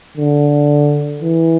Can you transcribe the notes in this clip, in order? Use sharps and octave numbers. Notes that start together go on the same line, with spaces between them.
D3
E3